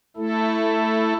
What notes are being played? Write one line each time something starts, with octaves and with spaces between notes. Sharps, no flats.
A3 E4 A4